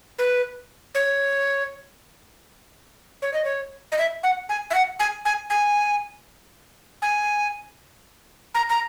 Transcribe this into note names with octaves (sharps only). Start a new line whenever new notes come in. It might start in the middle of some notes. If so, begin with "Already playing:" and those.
B4
C#5
C#5
D#5
C#5
D#5
E5
F#5
G#5
E5
F#5
G#5
G#5
G#5
G#5
A#5
A#5